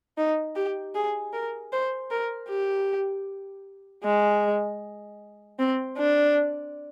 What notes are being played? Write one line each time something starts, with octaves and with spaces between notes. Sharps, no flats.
D#4
G4
G#4
A#4
C5
A#4
G4
G#3
C4
D4